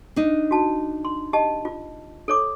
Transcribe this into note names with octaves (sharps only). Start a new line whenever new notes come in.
D4 D#4
F#4 A5
C6
G4 D#5 A5
F4
A4 C#5 D6